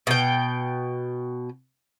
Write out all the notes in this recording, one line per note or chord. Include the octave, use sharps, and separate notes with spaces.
B2 G5